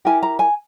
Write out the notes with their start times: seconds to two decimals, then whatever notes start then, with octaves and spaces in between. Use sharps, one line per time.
0.05 E4 G4 A#4 G#5
0.23 A#5
0.39 G#5